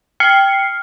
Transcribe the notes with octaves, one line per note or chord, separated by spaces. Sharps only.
G5 F6 C7 C#7